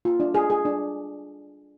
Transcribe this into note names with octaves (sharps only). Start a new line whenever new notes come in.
F4
D4
G#4
G#4
D4